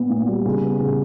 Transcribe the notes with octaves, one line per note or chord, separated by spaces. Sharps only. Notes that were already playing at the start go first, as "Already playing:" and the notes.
Already playing: A#2 B3
A#2
G3
C#3
B3
C#3